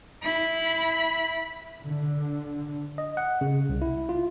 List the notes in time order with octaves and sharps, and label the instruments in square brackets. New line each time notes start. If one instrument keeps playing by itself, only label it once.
[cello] E4 [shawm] B5
[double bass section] D3
[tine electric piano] D#5
F#5
C#3
C2
E4
F4